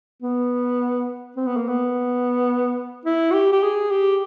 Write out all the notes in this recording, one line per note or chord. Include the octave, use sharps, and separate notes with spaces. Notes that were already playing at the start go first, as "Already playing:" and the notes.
B3
C4
B3
A#3
B3
E4
F#4
G4
G4
G#4
G4